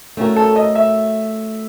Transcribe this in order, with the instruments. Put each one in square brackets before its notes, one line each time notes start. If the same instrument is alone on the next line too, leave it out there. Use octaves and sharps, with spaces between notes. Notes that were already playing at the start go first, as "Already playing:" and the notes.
[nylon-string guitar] A3 C#4 F#4 A#4
[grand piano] A4
D#5
E5